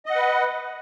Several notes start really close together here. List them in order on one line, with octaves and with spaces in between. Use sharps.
D#5 F#5 B4